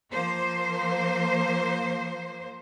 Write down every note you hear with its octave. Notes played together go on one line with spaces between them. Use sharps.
F3 A#3 C5